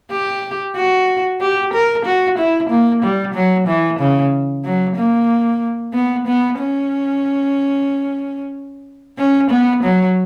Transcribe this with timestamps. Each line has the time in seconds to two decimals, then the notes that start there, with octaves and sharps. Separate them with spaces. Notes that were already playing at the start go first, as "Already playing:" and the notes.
0.11 G4
0.75 F#4
1.41 G4
1.73 A#4
2.05 F#4
2.38 E4
2.70 A#3
3.02 G3
3.34 F#3
3.68 E3
3.99 C#3
4.65 F#3
4.96 A#3
5.93 B3
6.27 B3
6.59 C#4
9.18 C#4
9.50 B3
9.83 F#3